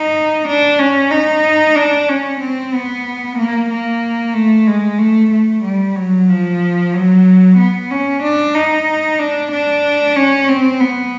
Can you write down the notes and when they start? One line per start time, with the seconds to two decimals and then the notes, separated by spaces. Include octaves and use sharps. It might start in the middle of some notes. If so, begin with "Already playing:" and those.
Already playing: D#4
0.48 D4
0.79 C#4
1.11 D#4
1.75 D4
2.09 C#4
2.41 C4
2.74 B3
3.38 A#3
3.69 A#3
4.34 A3
4.67 G#3
4.98 A3
5.31 A3
5.63 G3
5.95 F#3
6.29 F3
6.93 F#3
7.58 B3
7.90 C#4
8.23 D4
8.54 D#4
9.19 D4
9.51 D4
10.15 C#4
10.49 C4
10.80 B3